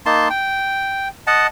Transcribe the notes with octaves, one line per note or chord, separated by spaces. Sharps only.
A#3 D#4 A5 C6
G5
D#5 F#5 A5